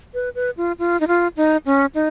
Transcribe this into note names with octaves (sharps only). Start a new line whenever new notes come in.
B4
B4
F4
F4
D#4
F4
D#4
C#4
D#4